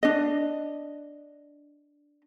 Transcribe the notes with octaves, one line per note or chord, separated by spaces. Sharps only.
D4 D#5